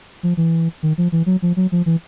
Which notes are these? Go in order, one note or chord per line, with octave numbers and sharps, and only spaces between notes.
F3
E3
D#3
F3
E3
F#3
F3
F#3
F3
E3